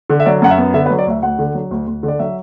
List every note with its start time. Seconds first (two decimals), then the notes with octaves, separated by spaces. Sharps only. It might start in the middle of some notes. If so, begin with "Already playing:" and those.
0.10 D3
0.20 E5
0.26 F#3 D5
0.42 F#2 F#5
0.50 E5
0.58 B3
0.74 D3 E5
0.86 B4
0.90 F#3
0.98 D5
1.07 D2 E5
1.23 D2 F#5
1.39 D3
1.54 F#3
1.71 D2
1.87 D2
2.03 D3
2.08 D5
2.19 F#3 E5